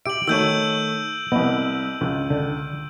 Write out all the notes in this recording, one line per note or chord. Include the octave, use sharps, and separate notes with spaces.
G4 E5 D7 F#7
D#3 A3 F#4 C#5 E6 G6 D#7
C2 B3 D#5
C#2
D3